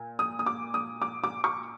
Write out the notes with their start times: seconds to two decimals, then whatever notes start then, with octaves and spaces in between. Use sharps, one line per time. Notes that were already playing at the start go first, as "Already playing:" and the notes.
Already playing: A#2
0.19 D#6
0.39 D#6
0.46 D6
0.74 D#6
1.02 D6
1.24 D6
1.44 C#6